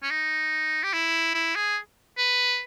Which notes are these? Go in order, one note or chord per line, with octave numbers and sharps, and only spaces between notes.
C#4
D#4
G4
E4
E4
G#4
B4